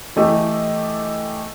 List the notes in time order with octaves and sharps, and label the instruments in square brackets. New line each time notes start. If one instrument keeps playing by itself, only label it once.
[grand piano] E3 A3 E4 G4 D#5